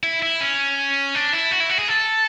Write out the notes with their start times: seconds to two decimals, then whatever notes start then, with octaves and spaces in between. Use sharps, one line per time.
0.03 E4
0.22 E4
0.41 C#4
1.15 D4
1.33 E4
1.51 F#4
1.60 E4
1.70 F#4
1.79 G#4
1.88 A4